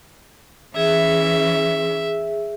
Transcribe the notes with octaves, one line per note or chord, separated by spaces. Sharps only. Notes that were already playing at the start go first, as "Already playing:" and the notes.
E3 C#4 G#4 E5